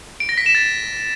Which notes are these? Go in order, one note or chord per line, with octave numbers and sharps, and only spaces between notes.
D7
A#6
B6
E7
A6